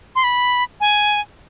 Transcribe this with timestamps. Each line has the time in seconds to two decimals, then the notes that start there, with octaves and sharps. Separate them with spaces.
0.16 C6
0.24 B5
0.80 G#5